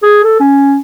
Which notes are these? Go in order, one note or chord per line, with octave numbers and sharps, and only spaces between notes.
G#4
A4
C#4